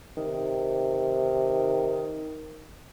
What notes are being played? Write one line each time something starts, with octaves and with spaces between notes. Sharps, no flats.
C3 D#3